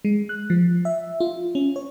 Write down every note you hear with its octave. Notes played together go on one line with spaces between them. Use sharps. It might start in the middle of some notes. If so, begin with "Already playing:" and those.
G#3
F#6
F3
E5
F4
C#4
C#5